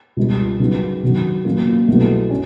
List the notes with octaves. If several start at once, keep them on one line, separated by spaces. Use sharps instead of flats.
C#2 B2 G3
C#3 F#3 B3 D#4
C3 D#3 F#3 B3
A#2 F#3 A#3 C#4 F4
C2 B2 F#3 A3
C#4